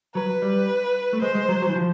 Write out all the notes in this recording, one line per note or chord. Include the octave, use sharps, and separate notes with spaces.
F#3 B4
G3
A3
G#3 C5
G#3
F#3
F#3
E3
F3